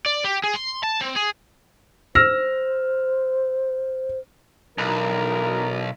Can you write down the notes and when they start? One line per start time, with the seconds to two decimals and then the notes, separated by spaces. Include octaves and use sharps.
0.06 D5
0.24 G4
0.44 G#4
0.55 C6
0.83 A5
1.01 C4
1.17 G#4
2.15 C5 E6 F6 A#6
4.78 B1 E3 D4 A#4